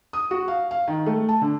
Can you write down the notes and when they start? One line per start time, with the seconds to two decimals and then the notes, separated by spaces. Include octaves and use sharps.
0.13 D#6
0.31 F#4
0.48 F5
0.71 F5
0.88 D#3
1.06 A3
1.29 A5
1.41 D3